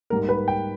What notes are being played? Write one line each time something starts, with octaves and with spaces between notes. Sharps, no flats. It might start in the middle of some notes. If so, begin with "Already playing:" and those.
G#2 G3 A#3 A#4
B4
G5